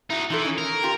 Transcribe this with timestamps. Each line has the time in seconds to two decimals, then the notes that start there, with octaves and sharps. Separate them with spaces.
0.10 D#4 E4 F#4
0.30 E3 D#4 F4 A4
0.45 C#4 D#4
0.58 A#4
0.83 F4 G4